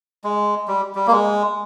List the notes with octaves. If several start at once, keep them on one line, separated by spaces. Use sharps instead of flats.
G#3
G3
G3
A#3
G#3